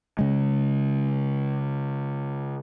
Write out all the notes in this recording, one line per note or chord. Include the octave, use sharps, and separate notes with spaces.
C#3 G#3